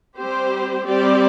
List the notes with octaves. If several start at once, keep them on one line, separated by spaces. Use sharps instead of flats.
G3 C4 G4 C5
G3 C4 G4 D5